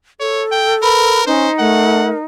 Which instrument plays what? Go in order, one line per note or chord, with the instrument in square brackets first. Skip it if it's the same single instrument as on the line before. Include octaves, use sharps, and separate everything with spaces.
[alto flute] A4 [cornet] C#5
[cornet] G5
[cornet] A#4 [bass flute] B4 [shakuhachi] B5
[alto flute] C#4 [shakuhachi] D#4 [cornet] C5
[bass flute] A3 [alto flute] A#4 [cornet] F#5